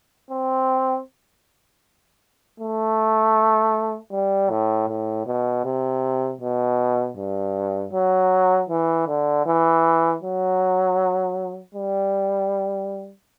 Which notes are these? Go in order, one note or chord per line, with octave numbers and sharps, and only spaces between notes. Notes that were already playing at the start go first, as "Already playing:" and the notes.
C4
A3
G3
A2
A2
B2
C3
B2
G2
F#3
E3
D3
E3
F#3
G3